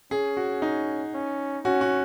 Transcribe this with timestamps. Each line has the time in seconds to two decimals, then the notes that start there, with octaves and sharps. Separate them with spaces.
0.11 C#4 G#4
0.37 F#4
0.62 D#4
1.14 C#4
1.65 C#4 F#4
1.81 F#4